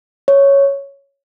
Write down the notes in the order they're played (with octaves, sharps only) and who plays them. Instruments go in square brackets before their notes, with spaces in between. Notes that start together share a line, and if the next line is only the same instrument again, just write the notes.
[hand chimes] C#5